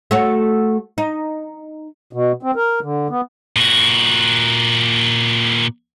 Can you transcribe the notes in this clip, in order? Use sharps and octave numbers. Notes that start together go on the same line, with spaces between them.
A3 F#4 C#5
D#4
B2
C4
A#4
D3
B3
A#2 F#4